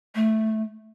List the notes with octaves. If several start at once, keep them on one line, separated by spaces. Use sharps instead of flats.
A3